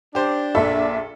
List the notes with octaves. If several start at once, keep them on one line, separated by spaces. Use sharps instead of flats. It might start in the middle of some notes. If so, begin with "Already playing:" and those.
D4 G4 C5
A#1 A4 E5